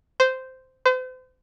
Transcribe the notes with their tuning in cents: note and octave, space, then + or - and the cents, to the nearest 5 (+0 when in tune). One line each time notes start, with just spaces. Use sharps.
C5 -10
C5 -40